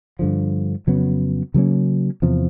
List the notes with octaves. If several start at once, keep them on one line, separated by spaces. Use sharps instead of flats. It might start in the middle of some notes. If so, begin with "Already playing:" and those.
G2 D3 F3
F2 C#3 F#3 B3
C#3 F#3 A#3 C#4
E2 C3 F3